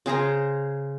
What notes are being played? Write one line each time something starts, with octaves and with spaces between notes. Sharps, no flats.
C#3 G#4 C5 A#5